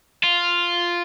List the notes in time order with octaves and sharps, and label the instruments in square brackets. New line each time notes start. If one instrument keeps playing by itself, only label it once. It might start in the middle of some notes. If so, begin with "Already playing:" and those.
[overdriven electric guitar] F4